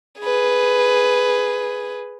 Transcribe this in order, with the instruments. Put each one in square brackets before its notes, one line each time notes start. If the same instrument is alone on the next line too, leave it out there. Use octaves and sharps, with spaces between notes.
[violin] G#4 B4